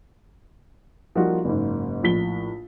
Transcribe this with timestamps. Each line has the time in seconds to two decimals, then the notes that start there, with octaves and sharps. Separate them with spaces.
1.15 F3 G3 A#3 D#4 F4 F#4
1.45 F#1 G#2
2.03 A#1 A2 B6 G7